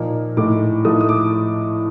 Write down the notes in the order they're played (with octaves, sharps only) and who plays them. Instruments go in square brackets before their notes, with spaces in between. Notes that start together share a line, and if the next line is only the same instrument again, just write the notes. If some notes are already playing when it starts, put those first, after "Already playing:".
Already playing: [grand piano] A#2 F3 A#3 D#4
A2 A3 D#4 D6
A2 F3 A3 D#4 D#6
D#6
D6